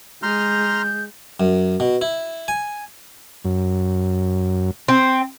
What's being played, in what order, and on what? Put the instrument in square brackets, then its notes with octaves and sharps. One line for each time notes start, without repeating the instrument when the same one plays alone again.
[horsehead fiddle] G#3 [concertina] A#5 C6 F6 [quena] G6
[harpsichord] F#2
B2
E4
G#5
[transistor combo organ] F#2
[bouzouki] C4